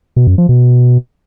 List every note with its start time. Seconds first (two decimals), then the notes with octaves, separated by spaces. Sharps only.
0.16 B2
0.27 F#2
0.38 F3
0.49 B2